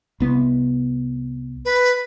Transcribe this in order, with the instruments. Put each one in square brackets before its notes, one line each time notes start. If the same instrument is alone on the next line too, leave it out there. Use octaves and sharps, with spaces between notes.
[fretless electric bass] C2 B3
[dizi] B4